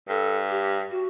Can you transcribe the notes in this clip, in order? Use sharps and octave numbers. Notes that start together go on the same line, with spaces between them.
G2 A4
G4
F#4